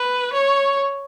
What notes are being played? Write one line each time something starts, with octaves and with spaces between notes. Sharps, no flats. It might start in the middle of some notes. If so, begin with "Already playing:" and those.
Already playing: B4
C#5